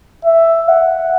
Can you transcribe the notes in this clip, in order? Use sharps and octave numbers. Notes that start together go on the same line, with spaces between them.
E5
F#5